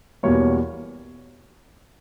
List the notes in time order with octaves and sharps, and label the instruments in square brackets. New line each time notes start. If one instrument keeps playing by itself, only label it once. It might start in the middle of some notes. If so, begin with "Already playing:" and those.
[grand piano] E2 B2 G3 A#3 C#5